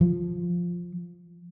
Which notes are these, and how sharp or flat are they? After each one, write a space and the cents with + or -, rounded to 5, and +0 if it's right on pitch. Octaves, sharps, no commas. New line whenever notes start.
F3 +5